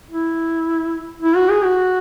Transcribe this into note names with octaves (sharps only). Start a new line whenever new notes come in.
E4
E4
F#4
G#4
F#4